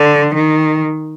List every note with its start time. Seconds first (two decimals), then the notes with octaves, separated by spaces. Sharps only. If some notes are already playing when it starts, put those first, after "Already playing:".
Already playing: D3
0.34 D#3